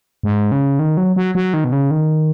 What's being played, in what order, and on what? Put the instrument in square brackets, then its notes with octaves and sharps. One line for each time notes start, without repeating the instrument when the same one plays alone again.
[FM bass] G#2
C#3
D#3
F#3
F#3
F#3
D#3
B2
C#3
D#3